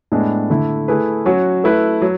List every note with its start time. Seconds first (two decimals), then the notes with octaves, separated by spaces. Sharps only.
0.12 A2 G#3 B3 D4
0.50 D3 A3 E4
0.88 A3 E4 G#4 B4
1.26 F#3 C#4 F#4
1.64 A3 E4 B4
2.02 F#3